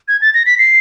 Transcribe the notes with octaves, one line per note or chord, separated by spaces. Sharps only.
G#6
A6
A#6
B6
C7